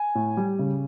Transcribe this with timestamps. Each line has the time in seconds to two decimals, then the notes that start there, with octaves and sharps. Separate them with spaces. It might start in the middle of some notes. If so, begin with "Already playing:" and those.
Already playing: G#5
0.15 A2
0.37 G3
0.59 C#3